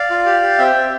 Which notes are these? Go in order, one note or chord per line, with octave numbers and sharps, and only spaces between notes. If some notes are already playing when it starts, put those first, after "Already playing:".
Already playing: D5 F5
F4
G4
G4
C4 E5 G5
C4